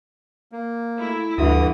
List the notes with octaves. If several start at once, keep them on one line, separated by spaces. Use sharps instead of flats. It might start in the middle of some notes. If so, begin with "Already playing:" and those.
A#3
A3 E4
D2 G2 D3 E3 E4 F#4 E5 D#6